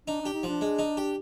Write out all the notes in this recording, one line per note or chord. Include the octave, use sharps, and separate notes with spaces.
D4 D#4
D4 G4
D#4
F3 D4
G#3
D#4
G4